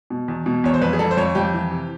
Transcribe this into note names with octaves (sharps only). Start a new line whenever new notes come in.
B2
E2
B2
E2 C#5
C5
F2 B4
G#4
F2 A4
C5
F2 C#5
F2 G4
E3
C3